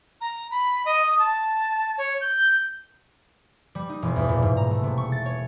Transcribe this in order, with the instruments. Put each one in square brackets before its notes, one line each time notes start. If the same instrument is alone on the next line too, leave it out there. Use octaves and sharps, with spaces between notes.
[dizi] A#5
B5
D#5
D#6
A5
C#5
G6
[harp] G3
D#4
E1
E2
A#2
G#2
A#5
A3
C3
C#6
A6
C#5